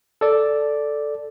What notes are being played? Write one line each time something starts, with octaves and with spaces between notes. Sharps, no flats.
A4 D5